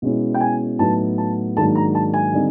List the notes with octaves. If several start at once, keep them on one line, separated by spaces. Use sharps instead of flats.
B2 G#3 C#4 E4
G5
G#5
A2 F#3 B3 D#4 A5
A5
G#2 D#3 F#3 A#3 D4 A5
A#5
A5
G#5
D3 G3 C4 D#4